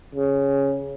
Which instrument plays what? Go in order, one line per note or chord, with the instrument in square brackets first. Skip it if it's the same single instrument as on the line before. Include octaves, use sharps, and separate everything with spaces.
[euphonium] C#3